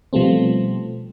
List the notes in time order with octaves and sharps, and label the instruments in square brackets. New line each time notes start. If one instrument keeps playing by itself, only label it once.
[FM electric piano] B2 F3 G3 A3 C4